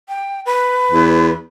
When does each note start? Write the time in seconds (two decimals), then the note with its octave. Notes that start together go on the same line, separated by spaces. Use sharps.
0.09 G5
0.46 B4
0.91 E2